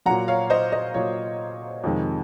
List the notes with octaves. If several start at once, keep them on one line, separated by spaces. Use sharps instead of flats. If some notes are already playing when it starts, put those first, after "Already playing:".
A#2 F#3 F#5 A#5
C#5 F5
C5 D#5
C5 D#5
A#2 F#3 C#5
F2 C3 D#3 G#3